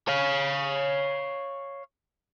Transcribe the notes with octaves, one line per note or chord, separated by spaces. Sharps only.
C#5 F5